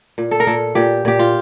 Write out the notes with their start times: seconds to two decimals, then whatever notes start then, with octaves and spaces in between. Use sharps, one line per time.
0.18 A#2
0.31 A4
0.40 A#4
0.47 A#2 A4
0.75 A#2 G4
1.05 A#2 G4
1.19 F4